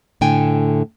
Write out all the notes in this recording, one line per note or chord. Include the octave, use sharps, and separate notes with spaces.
A2 D3 A3 G5 G#5